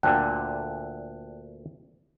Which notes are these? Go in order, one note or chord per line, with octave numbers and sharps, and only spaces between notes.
D2 A#2 D3 G5 A5 F#6